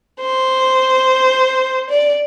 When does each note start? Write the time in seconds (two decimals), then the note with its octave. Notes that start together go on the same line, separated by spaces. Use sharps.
0.20 C5
1.90 D5